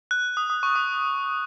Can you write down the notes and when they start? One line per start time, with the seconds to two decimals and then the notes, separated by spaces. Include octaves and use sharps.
0.11 F#6
0.37 D#6
0.50 D#6
0.63 C#6
0.75 D#6